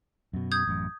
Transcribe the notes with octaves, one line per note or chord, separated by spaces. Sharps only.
F#2 B2
D#6 G6 G#6
A1 F#2